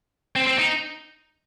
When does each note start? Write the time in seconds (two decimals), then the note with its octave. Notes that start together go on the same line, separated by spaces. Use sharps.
0.36 C4
0.47 C4
0.59 D#4